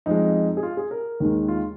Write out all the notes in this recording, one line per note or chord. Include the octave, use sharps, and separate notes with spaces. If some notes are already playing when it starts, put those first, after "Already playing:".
F2 F3 G#3 D#4
G#4
F4
G#4
A#4
D#2 D#3 G#3
F4